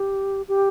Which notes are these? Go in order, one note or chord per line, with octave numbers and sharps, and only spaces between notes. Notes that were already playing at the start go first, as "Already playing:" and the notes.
Already playing: G4
G4